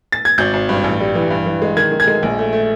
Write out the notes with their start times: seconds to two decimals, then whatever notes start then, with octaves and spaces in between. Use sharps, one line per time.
0.12 A6
0.25 G#6
0.38 G#1 G6
0.53 G#1
0.69 G2
0.84 A1
1.00 G3
1.15 E3
1.30 G2
1.46 E3
1.62 G#3
1.77 D#3 G#6
1.92 D#3
2.00 G#6
2.07 G#3
2.23 A#1
2.38 A3
2.53 A3